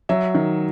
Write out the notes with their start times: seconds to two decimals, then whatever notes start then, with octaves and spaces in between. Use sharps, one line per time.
0.09 F#3 E5
0.35 D#3